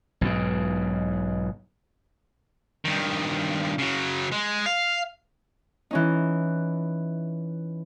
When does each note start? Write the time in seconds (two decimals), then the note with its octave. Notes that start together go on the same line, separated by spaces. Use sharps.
0.21 B1 G#2 B2
2.85 G2 D#3
3.78 C#3 F#3
4.32 G#3
4.66 F5
5.91 E3 C#4 D#4